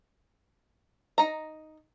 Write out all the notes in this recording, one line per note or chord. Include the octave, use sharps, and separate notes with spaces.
D#4 A#5